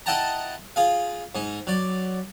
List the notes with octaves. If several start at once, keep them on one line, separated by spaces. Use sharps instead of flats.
E4 D#5 F#5 G5 A5 A#5
F4 G#4 F5
G#2 D#4
F#3 D5